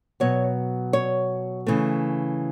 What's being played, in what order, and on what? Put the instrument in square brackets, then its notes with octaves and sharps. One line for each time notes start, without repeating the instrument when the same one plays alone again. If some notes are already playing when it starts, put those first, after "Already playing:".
[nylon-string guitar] B2 F#3 B3 C#5
C#5
C#3 E3 A3